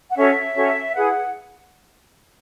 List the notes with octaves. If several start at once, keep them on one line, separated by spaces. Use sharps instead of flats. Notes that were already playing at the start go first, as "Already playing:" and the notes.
F#5
C#4 F#4 A4 C#5 E5
C#4 F#4 A4 C#5
E4 G#4 B4 F#5